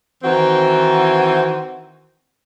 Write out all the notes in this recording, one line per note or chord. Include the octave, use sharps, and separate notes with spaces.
D#3 E3 C4 F#4